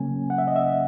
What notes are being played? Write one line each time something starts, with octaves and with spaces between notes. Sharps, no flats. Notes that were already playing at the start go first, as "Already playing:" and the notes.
Already playing: C#3 F#3 A#3 C#4 G#5
F#5
E5
D#5
E5